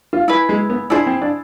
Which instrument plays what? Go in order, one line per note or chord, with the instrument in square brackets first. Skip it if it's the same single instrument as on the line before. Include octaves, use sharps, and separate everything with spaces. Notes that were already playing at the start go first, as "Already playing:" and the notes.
[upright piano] F4
[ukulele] E4 G#4 B4
[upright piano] G#3
B3
[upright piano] D4 [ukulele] E4 G#4 C5
[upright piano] C4
D4